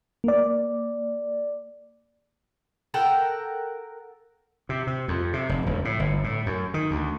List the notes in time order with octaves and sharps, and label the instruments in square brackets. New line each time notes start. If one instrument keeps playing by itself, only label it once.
[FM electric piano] A#3 D5
[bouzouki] A4 A#4 F#5 G5
[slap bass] C3
C3
F2
C3
F1
E1
A2
G1
A2
F#2
D#3
D2